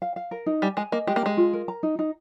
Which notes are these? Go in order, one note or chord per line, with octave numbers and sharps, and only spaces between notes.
F5
F5
A#4
D#4
G3 G#5
G#3 G#5
A#3 D#5
G#3 G4
A#3
G#3 A#5
F4
A#4
A#5
D#4
D#4